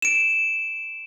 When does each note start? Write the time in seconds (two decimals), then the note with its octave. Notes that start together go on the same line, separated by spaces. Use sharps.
0.02 D7 E7